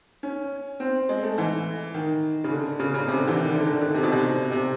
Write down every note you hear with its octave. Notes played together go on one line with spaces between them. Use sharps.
C#4
C4
G#3
A3
E3
D#3
C#3
D3
C#3
C#3
C3
D3
E3
D#3
D3
D3
D#3
D3
C3
B2
C3
C3